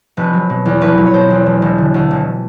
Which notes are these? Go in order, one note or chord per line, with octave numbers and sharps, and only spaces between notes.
F1 B4
F#3
B2
E2
F1 B4
F#3
C#5
B2 C5
E2
E1
E1
D3
D2
E1